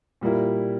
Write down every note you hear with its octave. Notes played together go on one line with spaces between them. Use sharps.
A#2 G3 A#3 E4